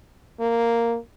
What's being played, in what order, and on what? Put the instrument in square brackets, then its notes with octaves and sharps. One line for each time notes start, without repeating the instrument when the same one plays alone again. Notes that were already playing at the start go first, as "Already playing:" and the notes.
[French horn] A#3